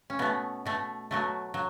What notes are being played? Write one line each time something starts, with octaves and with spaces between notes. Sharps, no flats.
C#4
B2 A3 B3
B2 A3
B2 F#3 A3
F#3